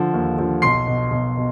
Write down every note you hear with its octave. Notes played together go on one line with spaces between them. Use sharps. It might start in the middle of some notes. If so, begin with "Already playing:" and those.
Already playing: D3 F3
D#2
D3 F3
B1 C6 C7
B2
B1
B2